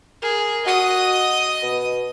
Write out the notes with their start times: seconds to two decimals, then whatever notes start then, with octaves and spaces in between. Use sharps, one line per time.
0.22 G#4 A#4
0.66 F#4 D#5 D#6
1.63 B2